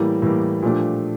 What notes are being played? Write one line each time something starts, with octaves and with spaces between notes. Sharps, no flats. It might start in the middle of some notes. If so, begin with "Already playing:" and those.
Already playing: A2 E3 G3 A#3
A2 E3 G3 A#3
A#2 F3 A3 D4 G4